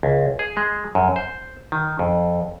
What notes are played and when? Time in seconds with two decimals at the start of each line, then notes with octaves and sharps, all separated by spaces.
0.03 C#2
0.39 G#4
0.57 G#3
0.95 F#2
1.16 C5
1.72 D#3
1.99 F2